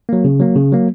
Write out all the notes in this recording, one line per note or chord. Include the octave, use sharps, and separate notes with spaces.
F#3 A#3
C#3
F#3 A#3
C#3
F#3 A#3